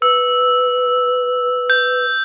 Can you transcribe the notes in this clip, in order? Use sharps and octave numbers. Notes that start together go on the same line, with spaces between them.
B4 E6
G6